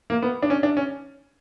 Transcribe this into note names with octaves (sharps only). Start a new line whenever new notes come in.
A#3
B3
D4
C#4
D4
C#4